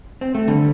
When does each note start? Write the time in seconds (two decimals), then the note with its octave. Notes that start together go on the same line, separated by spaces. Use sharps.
0.21 C4
0.35 A3
0.47 D3 G3